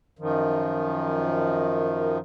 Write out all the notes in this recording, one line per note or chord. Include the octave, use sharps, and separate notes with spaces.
F#2 D#3 F3